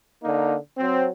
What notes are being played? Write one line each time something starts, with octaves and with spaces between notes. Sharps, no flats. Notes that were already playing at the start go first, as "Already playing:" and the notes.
D3 A#3 D#4
F#3 C4